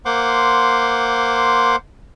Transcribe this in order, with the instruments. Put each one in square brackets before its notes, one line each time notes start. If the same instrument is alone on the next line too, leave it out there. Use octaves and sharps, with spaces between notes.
[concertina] A#3 C5 F#5 C6 D6